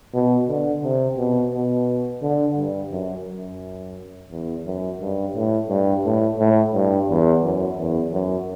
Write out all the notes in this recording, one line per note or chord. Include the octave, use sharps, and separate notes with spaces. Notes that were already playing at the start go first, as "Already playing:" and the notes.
B2
D3
C3
B2
B2
D3
G2
F#2
F#2
E2
F#2
G2
A2
G2
A2
A2
G2
E2
F#2
E2
F#2